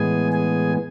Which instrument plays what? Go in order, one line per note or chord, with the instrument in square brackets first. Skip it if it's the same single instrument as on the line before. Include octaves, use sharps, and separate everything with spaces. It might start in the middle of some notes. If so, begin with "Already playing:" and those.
Already playing: [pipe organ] A2 E3 G#3 B3 G#4 G#5
G#4 G#5